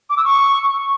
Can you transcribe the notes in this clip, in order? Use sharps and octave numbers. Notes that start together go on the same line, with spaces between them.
D6
E6
C#6